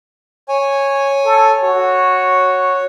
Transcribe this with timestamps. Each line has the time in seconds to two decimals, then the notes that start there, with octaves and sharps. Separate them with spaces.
0.49 C#5 G#5
1.25 A4
1.63 F#4 C#5